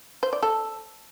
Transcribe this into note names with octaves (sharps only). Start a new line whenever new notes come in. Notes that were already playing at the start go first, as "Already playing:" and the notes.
C5
D5
A4